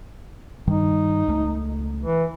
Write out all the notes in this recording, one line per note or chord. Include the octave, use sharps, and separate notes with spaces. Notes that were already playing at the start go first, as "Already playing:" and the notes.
G2 D#3 G3 D#4
C#2 A3
E3